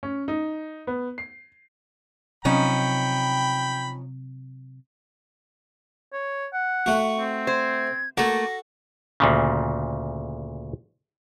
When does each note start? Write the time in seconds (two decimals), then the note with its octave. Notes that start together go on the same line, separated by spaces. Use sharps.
0.03 C#4
0.28 D#4
0.87 B3
1.18 C7
2.45 C3 F3 F#3 C4 C#4 D#4 G5 B5
6.13 C#5
6.54 F#5
6.86 A3 F#4 C#6
7.18 C4
7.47 C5 G#6
8.17 A3 A#3 F#4 A4 A#6
9.20 D2 A#2 C#3